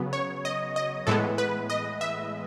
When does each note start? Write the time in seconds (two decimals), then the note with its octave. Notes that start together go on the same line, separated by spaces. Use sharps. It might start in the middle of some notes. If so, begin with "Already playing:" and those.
Already playing: C#3 F#3 B3
0.13 C#5
0.45 D#5
0.76 D#5
1.07 A2 E3 G#3 B3 A4
1.38 B4
1.70 D#5
2.01 E5